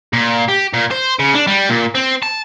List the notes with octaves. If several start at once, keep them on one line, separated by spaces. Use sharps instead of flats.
A#2
G4
A#2
C5
C#3
D4
G3
A#2
C4
A5